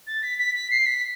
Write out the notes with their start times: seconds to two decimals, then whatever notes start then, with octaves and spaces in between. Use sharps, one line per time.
0.07 A6
0.23 B6
0.38 B6
0.55 B6
0.71 C7
0.86 B6